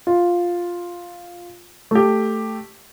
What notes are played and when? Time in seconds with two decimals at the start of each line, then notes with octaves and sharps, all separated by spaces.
0.07 F4
1.91 A3 G4